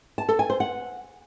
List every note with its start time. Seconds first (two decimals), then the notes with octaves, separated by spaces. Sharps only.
0.18 A5
0.29 A4
0.39 G#5
0.50 C5
0.60 F#5